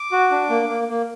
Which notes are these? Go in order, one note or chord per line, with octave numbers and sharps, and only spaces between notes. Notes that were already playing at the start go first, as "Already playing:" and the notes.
Already playing: D6
F#4
D4
A#3
A#3
A#3